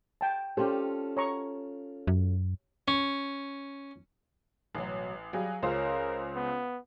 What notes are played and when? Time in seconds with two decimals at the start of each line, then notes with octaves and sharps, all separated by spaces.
0.21 G5 A5
0.57 C#4 F4 G4 A4 C5
1.17 C#5 A#5 C#6
2.07 F#2
2.88 C#4
4.75 A1 B2 F#3
5.33 F#3 G3 G#4 F5
5.63 C#2 C#4 F4 A#4 C5
6.35 B3